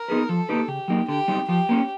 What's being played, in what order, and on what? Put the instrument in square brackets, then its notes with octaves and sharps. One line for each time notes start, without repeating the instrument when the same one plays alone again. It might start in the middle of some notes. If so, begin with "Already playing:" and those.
Already playing: [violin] A#4
[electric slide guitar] B3 D#4 G#4 B4
[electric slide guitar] F3 [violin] A4
[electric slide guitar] A#3 D#4 G4 B4
[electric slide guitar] C#3 [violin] G4
[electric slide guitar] F#3 A#3 D#4
[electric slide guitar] D3 [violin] G4
[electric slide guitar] G3 C4 D#4
[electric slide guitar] F3 [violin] G4
[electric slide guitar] A#3 C#4